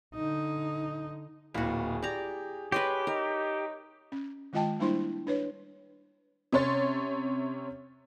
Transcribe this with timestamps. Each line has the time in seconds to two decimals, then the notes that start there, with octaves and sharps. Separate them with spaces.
0.15 D3 D#4
1.54 D1 A#2 E4 F#4 G#4 F5
2.02 G4 D5 A#5
2.72 G4 B4 C#5 D#5 C6
3.07 D#4 A#4
4.12 C#4
4.53 D#3 G#3 F4 D#5 G5 A5
4.80 G3 A#3 D4 E4 C5 C6
5.27 D4 B4 C#5
6.52 C3 C#4 C#5 C6 A6